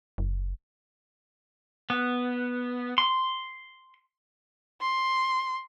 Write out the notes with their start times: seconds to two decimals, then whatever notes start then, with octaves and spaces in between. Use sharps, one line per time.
0.18 F#1
1.90 B3
2.98 C6
4.81 C6